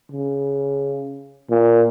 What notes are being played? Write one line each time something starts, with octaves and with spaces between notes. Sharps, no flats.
C#3
A#2